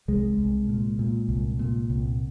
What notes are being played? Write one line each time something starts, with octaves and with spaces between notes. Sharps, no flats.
C2 G#3
C2
A#2
A#2
C2
A#2
C2